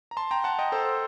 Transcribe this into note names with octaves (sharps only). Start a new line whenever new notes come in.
A#5
A5 C6
G5 A#5
F#5 A5
D#5 G5
A4 C5